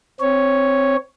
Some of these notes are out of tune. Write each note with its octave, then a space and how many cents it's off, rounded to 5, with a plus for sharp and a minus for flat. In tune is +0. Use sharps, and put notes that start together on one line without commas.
C4 +0 C#5 +0